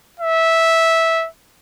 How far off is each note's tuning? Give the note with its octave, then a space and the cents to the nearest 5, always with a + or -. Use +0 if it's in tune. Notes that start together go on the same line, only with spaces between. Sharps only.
E5 -10